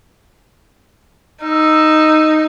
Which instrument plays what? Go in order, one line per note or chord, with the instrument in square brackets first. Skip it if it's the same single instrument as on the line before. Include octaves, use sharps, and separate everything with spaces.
[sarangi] D#4 [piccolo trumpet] E6